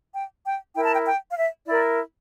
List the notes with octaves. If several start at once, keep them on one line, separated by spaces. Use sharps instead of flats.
G5
G5
E4 A#4 G5
A5
G5
G5
F5
E5
E4 A#4 D5